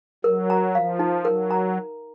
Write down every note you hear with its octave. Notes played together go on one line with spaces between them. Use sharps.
F#3 A#4
A#5
F3 F5
D#4
F#3 A#4
A#5